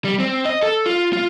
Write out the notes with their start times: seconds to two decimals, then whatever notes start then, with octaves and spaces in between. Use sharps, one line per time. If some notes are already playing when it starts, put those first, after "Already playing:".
0.05 G3
0.20 C4
0.45 D#5
0.63 A4
0.86 F4
1.13 F4